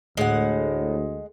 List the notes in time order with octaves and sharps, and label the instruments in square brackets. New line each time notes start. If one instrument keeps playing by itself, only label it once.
[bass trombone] D2 [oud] A2 [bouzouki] G#3 F#5